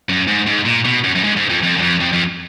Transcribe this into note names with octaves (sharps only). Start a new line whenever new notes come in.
F#2
G#2
G#2
A#2
B2
F#2
F#2
G#2
G#2
F2
F2
F#2
F2
F2
F2